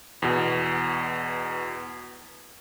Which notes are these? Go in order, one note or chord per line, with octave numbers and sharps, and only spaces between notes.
E2 B2